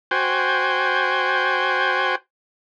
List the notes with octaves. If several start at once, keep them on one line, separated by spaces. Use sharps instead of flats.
F#4 C5 G5 G#5